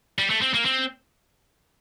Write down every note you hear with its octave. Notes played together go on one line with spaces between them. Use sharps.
G3
A3
C4
A#3
C4